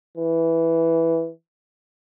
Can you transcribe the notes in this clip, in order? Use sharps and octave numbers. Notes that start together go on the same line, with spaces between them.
E3